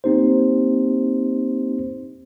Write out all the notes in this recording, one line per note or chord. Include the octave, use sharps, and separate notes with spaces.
A#3 C4 D#4 G4 C5